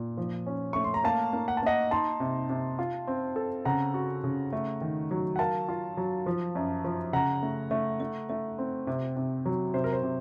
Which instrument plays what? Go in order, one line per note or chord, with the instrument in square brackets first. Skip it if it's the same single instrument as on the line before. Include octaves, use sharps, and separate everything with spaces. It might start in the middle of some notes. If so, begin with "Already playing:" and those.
Already playing: [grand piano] A#2
F3
C#4
[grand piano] A3 [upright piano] C#6
[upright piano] C6
A#5
[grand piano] A#3 [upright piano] F5 A5
[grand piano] A#3
[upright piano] F#5
A5
[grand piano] A#3 [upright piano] D#5 F#5
[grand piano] D#4 [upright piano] A5 C6
[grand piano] C3
C3
F4
C4
A4
[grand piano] C#3 [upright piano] F#5 A#5
[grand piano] F#4
C#3
A3
D#3
F#3
[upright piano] F#5
[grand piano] A#4 [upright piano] F5 A5
[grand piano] F4
F#3
F3
F#2
F3
[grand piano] C#3 [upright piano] F#5 A#5
[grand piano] A3
A3
A3
A3
C4
C3
C3
F#3
[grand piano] C3 [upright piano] C5
[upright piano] A#4
C5
[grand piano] C3